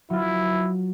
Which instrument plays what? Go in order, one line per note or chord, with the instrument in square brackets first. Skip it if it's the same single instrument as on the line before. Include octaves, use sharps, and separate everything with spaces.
[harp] F#3 F4 [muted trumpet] E4